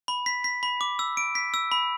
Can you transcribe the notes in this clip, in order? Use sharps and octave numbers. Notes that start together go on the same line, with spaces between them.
B5
B6
B6
B5
D6
E6
D7
B6
E6
B5